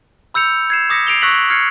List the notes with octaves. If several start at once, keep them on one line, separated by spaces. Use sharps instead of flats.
B5 E6 G6 C#7 F7
G#6 C7 E7
D6 D#6 A#6 B6 C#7
C7 D7 F7 G7
C#6 E6 F#6 A#6 B6 F#7
F6 G#6 C7 C#7